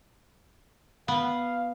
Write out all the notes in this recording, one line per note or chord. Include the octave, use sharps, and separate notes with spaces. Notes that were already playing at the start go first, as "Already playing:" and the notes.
B3 F5